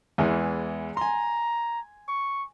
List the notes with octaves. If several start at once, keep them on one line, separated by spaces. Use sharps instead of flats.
E2 E3 G#3
G#5 A#5 C6
C#6